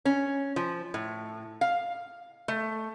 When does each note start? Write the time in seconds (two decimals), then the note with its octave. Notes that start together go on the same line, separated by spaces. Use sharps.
0.05 C#4
0.56 F3
0.94 A2
1.61 F5
2.48 A3